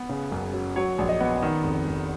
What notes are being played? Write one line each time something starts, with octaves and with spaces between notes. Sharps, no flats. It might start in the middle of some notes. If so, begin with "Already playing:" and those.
Already playing: B3 B4
C#3
F#1
F#3
F#3 C#5
A#1
D#5
B3
D#3
F1
F1